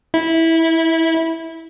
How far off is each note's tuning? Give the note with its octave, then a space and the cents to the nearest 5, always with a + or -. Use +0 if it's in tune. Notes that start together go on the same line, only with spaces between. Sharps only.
E4 -15